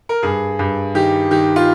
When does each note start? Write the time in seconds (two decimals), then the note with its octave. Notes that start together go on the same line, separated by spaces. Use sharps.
0.09 A#4
0.23 G2 G#4
0.59 G2
0.95 D#3 G4
1.31 D#3 G4
1.56 F4